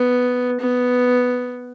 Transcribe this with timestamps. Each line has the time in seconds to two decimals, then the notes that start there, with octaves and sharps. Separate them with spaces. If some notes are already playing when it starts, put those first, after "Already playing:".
Already playing: B3
0.60 B3